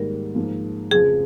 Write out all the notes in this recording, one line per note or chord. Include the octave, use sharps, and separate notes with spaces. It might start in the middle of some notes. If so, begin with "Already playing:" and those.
Already playing: G#2 D#3 G3 A#3 A#4
G#2 F3 A#3
F1 F2 C#3 F3 G#4